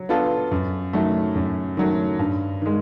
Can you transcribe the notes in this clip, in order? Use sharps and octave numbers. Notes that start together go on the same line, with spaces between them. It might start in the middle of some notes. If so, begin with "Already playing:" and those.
Already playing: F#3
B3 D4 F4 A4
F#2
D#3 F#3 A3
F#2
D#3 F#3 A3
G2
D#3 G#3